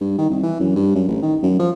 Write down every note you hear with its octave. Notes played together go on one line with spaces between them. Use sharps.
G2
D#3
C2
E3
F#2
G2
F#2
A1
D#3
F#2
F3